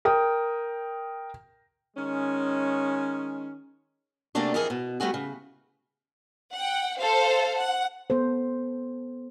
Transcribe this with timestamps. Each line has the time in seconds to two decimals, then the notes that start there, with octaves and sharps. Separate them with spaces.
0.05 A#4 G5 D#6
1.97 D#3 G#3 C#4
4.35 C3 A3 A#3 C#4 D4 F#4
4.54 F2 E3 D#4 G#4 A#4
4.70 B2
5.00 G3 A3 B3 F#4 G#4
5.14 C#3
6.54 F#5 G5
6.98 A4 C5 F5
7.57 F#5
8.10 B3 A4 C5